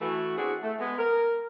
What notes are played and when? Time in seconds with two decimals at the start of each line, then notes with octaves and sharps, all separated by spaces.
0.01 E3 A3 F#4
0.37 B3 C4 D4 E4 F#4 G#4
0.62 A3
0.79 G#3 B3
0.98 A#4